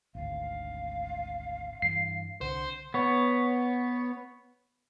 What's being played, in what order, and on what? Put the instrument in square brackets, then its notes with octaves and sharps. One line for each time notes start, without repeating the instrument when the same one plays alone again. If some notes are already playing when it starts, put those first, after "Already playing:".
[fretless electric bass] G#1 D2 [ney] F5
[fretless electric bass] G2 E3 G3 [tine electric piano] C7
[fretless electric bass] C2 D3 [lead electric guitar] C5 [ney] F#5
[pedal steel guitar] B3 C#5